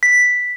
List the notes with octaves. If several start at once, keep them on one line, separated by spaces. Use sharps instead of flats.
B6